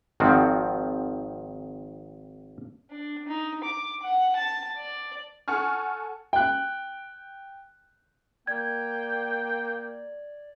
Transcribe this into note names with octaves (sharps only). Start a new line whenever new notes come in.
G#1 D#3 F3 C4 F#4
D4
D#4
D6
F#5
A5
D5
A4 F#5 G#5 C#6 F6
G5 F#6
A#3 D5 G5 G#6